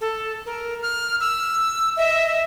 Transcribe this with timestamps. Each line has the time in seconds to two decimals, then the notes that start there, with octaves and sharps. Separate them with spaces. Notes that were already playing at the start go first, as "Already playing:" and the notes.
0.01 A4
0.46 A#4
0.82 F6
1.21 E6
1.97 D#5 E5